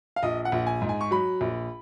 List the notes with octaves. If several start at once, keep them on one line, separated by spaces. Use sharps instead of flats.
F5
A#1 D#5
F#5
A#1
G#5
G#2
G#5
C#6
F#3 B5
A#1